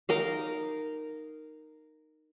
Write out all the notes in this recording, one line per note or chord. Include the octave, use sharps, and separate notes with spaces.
D#4 A#4 D#5 F5